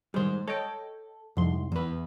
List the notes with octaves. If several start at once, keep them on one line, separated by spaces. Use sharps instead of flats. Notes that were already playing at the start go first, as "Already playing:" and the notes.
D#3 G3 G#3 C5
A4 C#5 D#5 G5
C2 F2 G#2 F3 C6
E2 B4